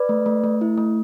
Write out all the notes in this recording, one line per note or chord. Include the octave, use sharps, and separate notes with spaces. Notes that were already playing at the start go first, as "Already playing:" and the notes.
Already playing: B4 D5
A3
A3
A3
E4
A3